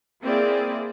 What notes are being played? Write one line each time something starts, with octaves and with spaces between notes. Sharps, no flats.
A#3 C4 E4 G#4 D5